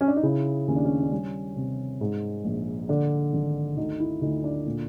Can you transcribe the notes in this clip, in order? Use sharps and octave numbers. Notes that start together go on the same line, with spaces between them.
C#4
D4
D#4
C#3 E4
D#2 C#4
D4
C#4
D4
G3 C#4
C3
G#2
A#1
D3 D4
G#1
D2 D#4
E4
D2 D#4
D4
A#2